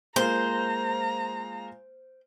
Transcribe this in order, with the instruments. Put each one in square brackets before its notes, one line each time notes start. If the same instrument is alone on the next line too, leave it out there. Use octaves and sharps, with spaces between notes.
[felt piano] G#3 A#3 F4 [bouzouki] C5 [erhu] A#5